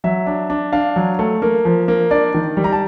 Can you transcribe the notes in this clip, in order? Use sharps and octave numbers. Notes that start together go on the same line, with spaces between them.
F#3 E5
D4
D4
D4 F5
F#3
A3
A#3
F3
A#3
D4 D5
D#3
G3
A#5
A5